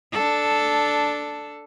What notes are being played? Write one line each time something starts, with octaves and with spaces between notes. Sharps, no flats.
D4 A4